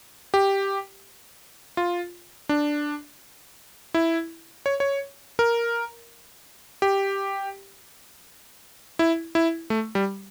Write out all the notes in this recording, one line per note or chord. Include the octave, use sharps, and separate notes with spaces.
G4
F4
D4
E4
C#5
C#5
A#4
G4
E4
E4
A3
G3